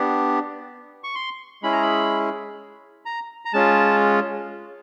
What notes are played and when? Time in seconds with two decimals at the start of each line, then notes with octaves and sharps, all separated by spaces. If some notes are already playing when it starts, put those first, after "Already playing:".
Already playing: B3 D4 G4
1.04 C#6
1.15 C6
1.63 G#3 C#4 E4 G#4 B5
1.73 A#5
1.82 B5
3.05 A#5
3.45 A#5
3.53 G#3 C#4 F4 A5